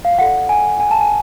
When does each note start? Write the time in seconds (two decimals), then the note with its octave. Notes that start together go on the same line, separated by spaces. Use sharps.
0.05 F5
0.18 F4 A4 D5 F#5
0.49 G#5
0.80 G#5
0.91 A5
1.01 G#5